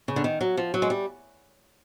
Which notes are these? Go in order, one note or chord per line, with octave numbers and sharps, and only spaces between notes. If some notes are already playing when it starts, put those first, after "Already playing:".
C#3
D3
D#3
F#3
F3
F#3
G#3
G3